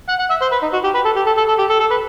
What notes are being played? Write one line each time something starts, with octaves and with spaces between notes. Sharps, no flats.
F#5
F#5
E5
C5
B4
D#4
F#4
G4
B4
A4
G4
A4
A4
A4
G4
A4
A4
B4